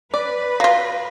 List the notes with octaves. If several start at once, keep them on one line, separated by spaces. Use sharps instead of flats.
B4 D5
F#3 F4 F5 A#6 C7